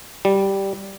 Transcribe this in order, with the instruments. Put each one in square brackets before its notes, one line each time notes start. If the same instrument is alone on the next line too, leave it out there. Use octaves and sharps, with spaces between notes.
[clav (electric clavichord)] G3